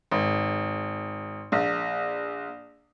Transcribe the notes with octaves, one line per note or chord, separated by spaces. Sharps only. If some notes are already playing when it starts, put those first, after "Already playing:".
G#1
A#1